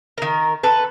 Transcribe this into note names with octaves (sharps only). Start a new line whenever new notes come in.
D#3 A#4
A4 B4